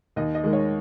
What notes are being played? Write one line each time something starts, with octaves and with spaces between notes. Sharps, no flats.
D#2 D#5
D#5
D#3 G#3
C#5